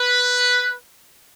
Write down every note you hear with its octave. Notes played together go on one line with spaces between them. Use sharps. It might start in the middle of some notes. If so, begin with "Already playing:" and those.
Already playing: B4